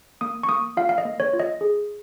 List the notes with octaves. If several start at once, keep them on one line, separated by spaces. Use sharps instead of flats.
A#3 D#6
C#6
A#3 D#6
F4 F5
F5
D#5
A#3
C#5
F4
D#5
G#4